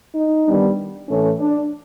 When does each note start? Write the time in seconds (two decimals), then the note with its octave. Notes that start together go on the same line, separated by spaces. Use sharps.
0.15 D#4
0.46 D#3 G3 B3 D4
1.09 A2 E3 A3 C#4
1.40 D4